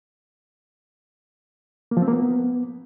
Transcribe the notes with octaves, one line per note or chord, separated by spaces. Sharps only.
A#3
F3
C4
A#3
B3